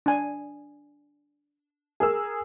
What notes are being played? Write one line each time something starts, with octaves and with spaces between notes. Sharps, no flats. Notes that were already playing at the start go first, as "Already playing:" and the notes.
D4 G#5
G#4 A#4 E6